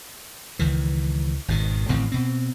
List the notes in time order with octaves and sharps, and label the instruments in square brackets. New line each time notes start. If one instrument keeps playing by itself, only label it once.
[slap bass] C#2 D#3 E3
G#1 B2 D#3
A1 A2 D#3 C4
B2 C4